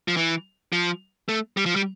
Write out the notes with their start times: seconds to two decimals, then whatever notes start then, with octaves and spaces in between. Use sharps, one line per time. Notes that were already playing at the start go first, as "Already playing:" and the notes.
0.08 F3
0.17 E3
0.73 F3
1.29 A3
1.57 G3
1.66 F3
1.76 G3